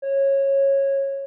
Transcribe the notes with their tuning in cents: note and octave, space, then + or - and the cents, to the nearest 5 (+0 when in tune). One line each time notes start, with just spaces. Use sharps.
C#5 -15